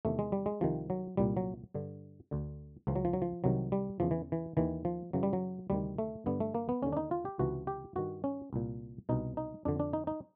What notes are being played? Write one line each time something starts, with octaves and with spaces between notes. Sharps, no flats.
E2 C3 D#3 A3
G#3
G3
G#3
C2 C3 D#3 F3
F#3
C2 A#2 G3
F#3
G2 D3
D2 D3
C#2 C#3 E3 F3
F#3
F3
F#3
F3
C2 C3 D#3 F#3
G3
E2 C#3 E3 F3
E3
E3
D#2 D#3 E3
F3
F#2 C#3 E3 F#3
G3
F#3
D2 C3 D#3 G3
A3
G2 D3 B3
A3
A#3
B3
D#2 D3 C#4
D4
D#4
F4
G4
C#2 C3 E3 F#4
G4
G2 D#3 F#4
C#4
C2 A#2
C2 B2 D#4
D#4
F2 D3 D4
D4
D#4
D#4